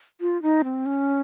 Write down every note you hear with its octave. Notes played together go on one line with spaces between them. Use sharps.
F4
D#4
C4
C#4